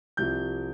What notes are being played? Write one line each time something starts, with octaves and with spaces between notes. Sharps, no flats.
C2 C3 F3 G6